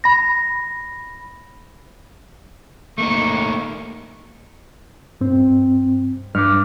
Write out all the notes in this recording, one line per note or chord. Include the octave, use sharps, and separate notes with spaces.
B5 A#6
A3 A#3 D#4 C#6
G2 C4
G2 D6 F6